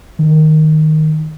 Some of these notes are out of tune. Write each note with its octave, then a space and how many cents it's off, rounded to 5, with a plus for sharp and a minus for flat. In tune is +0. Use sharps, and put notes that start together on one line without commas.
D#3 -5